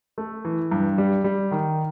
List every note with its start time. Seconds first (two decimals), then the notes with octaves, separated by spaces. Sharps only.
0.18 A3
0.45 E3
0.72 G2
0.98 G3
1.24 G3
1.51 D#3